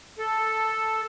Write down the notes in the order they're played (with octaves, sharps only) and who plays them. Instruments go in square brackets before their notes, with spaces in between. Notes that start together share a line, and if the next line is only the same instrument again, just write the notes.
[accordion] A4